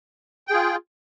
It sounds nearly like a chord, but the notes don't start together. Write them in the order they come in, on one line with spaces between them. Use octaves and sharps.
G5 G#4 F4